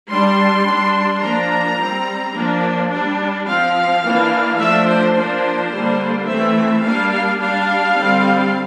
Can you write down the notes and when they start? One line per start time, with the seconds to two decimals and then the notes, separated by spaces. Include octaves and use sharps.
0.08 G3 D4 C6
0.64 G3 D4
1.21 F3 A#3 D4 A#5
1.77 G3 C4
2.33 F3 A#3 D4
2.90 G3 D4
3.46 F3 C4 F5
4.03 E3 A#3 D4
4.58 F3 A3 D4 E5
4.87 C5
5.14 F3 A#3 D4 C5
5.71 D3 G3 A#3 D4
6.27 E3 A3 C4 E5
6.83 G3 A#3 D4 F5
7.11 F5
7.39 G3 D4 F5
7.96 D3 G3 C4